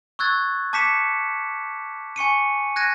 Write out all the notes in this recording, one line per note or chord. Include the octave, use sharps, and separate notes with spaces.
C#6 E6 F#6 G#6 A6
A5 D6 G6 B6 C#7 E7
G#5 C#6 C#7 D#7
F#6 G#6 A#6 D#7